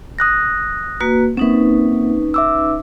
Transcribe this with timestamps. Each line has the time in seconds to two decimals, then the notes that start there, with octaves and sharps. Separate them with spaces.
0.19 D#6 F#6 A#6
1.00 A#3 F#4 B4
1.37 A#3 C4 C#4 D#4 B4
2.34 E5 D6 E6